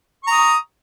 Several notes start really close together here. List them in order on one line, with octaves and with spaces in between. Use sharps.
C#6 A#5 D#6